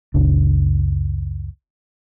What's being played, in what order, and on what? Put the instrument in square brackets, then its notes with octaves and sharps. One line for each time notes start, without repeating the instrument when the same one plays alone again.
[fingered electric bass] F#1 C#2 D4